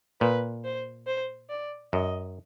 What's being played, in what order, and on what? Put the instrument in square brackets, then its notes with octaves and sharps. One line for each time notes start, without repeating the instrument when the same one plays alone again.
[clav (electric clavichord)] A#2 [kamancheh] B4
[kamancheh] C5
C5
D5
[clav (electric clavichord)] F#2 [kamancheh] D#5